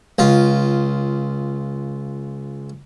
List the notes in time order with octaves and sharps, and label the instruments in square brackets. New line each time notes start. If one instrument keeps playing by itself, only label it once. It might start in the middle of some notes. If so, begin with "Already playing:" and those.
[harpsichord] C#2 F4